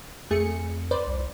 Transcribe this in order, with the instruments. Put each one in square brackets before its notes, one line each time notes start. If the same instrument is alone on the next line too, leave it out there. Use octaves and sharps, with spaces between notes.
[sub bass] F2 [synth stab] A3 G#4 C#7
[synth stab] B4 C5 D5
[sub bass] C2